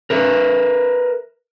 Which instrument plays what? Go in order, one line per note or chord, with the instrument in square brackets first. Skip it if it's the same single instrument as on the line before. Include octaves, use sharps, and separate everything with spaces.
[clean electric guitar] A#4 B4 E5